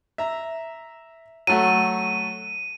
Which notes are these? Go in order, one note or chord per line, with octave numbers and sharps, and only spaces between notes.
E5 A#5
F#3 A3 F#4 D#7